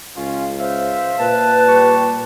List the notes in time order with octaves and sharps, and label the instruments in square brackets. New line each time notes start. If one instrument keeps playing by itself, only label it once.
[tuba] C#2 [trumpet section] C#4 F4
[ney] C5 [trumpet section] E5 F5
[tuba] A#2 [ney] B4 [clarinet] A5
[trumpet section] G3 G4 C#6